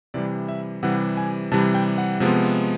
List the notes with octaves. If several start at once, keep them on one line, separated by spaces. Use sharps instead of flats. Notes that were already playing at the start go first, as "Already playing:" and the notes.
C3 E3 G3 D5
E5
C3 E3 G3 F#5
G#5
C3 E3 G3 A5
G5
F#5
C3 F3 G#3 B3